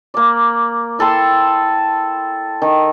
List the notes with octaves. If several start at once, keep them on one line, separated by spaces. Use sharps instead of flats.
A#3 D5
E4 A4 G5 C6
D#3